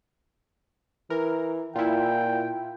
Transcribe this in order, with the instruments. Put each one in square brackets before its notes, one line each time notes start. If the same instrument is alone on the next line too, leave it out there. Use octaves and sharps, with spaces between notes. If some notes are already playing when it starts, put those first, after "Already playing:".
[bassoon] E3 [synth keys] A#4
[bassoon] A#2 [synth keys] E4 F4 [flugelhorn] G5